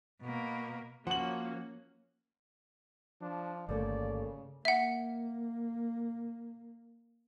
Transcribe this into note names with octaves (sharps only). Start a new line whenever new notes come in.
B2 A#3
F3 A#3 C#4 F#4 F#5 F#7
F3 D4
G1 D#2 C#3 A3 D5
A#3 E5 F#5